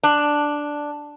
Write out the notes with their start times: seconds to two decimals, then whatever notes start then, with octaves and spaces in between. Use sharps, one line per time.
0.03 D4